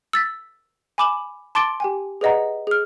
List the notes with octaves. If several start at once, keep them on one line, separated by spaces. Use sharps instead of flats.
E6 A6 B6
G#5 B5 D6 E7 F#7
A5 C6 D6 A6 D7 G7
G4 G5 G#5
G#4 B4 D5 D#5 F#5 A#5
G#4 F6